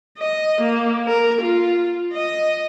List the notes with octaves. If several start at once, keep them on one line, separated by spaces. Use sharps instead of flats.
D#5
A#3
A#4
F4
D#5